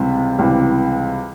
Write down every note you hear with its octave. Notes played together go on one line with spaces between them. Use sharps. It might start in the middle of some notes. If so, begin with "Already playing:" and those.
Already playing: C#2 C3 E3 G3
C#2 C3 E3 G3